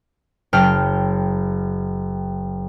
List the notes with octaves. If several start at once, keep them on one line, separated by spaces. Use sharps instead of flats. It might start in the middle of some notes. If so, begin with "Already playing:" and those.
F#1 G5 F6